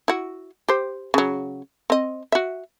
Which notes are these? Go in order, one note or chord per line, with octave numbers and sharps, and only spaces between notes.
E4 F#4
G4 C5
C#3 F#3
C4 D#5
F#4 E5